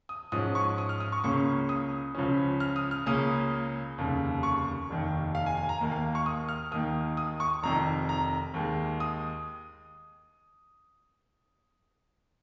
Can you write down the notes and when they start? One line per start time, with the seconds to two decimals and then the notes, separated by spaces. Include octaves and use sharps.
0.09 D#6
0.32 G#2 F3 C#4 D#6
0.55 C#6
0.78 D#6
0.89 F6
1.00 D#6
1.12 C#6
1.24 C#2 C#3 A#3 C#4 C#6
1.69 D#6
2.15 C#2 C#3 F3 C#4
2.60 F6
2.76 D#6
2.91 F6
3.06 C#2 C#3 A#3 C#4 D#6
3.98 F1 D#2 C#3
4.43 C#6
4.90 F1 D#2 D#3
5.35 F5
5.46 G#5
5.57 G#5
5.69 A#5
5.81 D#2 D#3 A#3
5.92 F5
6.15 C#6
6.26 D#6
6.49 F6
6.71 D#2 D#3 A#3 D#6
7.17 D#6
7.40 C#6
7.63 F1 F2 D#3 A#5
8.09 A#5
8.54 D#2 D#3 G#3
9.00 D#6